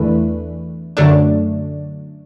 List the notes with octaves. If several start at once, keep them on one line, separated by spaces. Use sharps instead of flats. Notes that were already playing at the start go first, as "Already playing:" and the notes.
Already playing: E2 E3 A3 D4 B4
F#2 D3 F#3 A3 D4